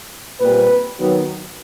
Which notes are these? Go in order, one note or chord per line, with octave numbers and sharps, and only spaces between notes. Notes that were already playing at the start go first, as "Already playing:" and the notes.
A#2 G3 C4 B4
D#3 F#3 B3